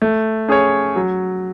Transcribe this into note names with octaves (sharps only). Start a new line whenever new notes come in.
A3
C#4 G#4 C#5
F#3